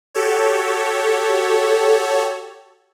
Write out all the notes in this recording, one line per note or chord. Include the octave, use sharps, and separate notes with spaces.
F#4 G4 A4 C#5